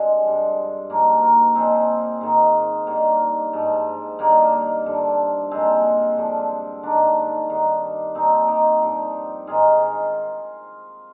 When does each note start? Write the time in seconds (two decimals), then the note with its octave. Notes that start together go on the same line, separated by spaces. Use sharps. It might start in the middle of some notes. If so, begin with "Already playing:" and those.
Already playing: G2 D3 G#3 C4
0.23 G2 F3
0.90 G#2 F3 A#3
1.22 A#3
1.55 A#2 F3 G#3 C4
2.21 G#2 D#3
2.87 G2 D#3 A#3
3.53 G#2 F3
4.19 G2 D#3 A#3
4.85 G2 D3 F3
5.51 A#2 F3 G#3 C4
6.17 G2 D3 F3
6.83 G#2 D#3 A#3 D4
7.50 G2 D#3
8.15 A#2 F3 C4 D#4
8.48 D#4 G4
8.81 G2 F3
9.47 G#2 D#3 F4 G#4